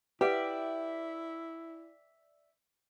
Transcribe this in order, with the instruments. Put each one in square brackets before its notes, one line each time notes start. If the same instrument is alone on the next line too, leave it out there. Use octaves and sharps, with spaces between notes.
[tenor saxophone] E4 [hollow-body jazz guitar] G4 [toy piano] B4 F#5 [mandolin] D5 E5